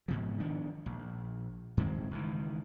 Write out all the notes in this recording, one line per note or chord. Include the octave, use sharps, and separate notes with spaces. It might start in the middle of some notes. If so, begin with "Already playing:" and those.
G#2 B2 F3
D#3 F3 B3 D4
A#1
G2 D#3 G#3 C4
C#2 D#3 E3